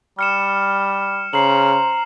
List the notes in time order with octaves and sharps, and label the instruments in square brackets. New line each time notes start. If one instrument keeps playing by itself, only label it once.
[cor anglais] G3 [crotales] F6 C#7 E7
[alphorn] C#3 [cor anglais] C5 [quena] A#5 [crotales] C7 F#7